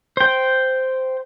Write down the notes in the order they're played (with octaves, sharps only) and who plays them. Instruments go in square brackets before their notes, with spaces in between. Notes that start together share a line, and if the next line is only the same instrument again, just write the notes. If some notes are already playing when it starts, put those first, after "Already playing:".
[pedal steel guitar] C5 G5